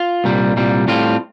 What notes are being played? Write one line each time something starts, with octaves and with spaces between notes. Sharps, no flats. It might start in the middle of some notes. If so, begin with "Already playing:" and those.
Already playing: F4
C2 A#2 G3
C2 A#2 G3
A2 G3 C4 F4